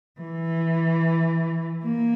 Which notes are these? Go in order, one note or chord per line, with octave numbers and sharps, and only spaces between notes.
E3
A#3